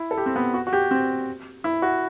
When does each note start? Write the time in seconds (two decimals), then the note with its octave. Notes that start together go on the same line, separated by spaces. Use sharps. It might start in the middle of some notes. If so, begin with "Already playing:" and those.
Already playing: E4
0.11 A4
0.18 G4
0.26 C4
0.36 B3
0.54 F#4
0.67 F#4
0.73 G4
0.91 C4
1.64 E4
1.82 F#4